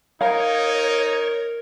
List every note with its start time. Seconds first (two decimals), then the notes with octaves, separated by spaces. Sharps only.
0.21 D#4 A#4 C#5 F5 A#5